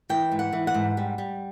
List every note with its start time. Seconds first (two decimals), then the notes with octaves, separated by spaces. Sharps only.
0.09 E3 G5
0.32 G#2
0.39 F#5
0.53 E3
0.67 F#5
0.74 G#2
0.97 G3
1.18 G3